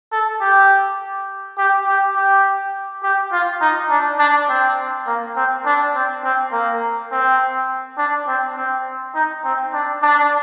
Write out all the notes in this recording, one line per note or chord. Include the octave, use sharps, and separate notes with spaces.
A4
G4
G4
G4
G4
G4
F4
D#4
D4
D4
C4
A#3
C4
D4
C4
C4
A#3
C4
D4
C4
C4
D#4
C4
D4
D4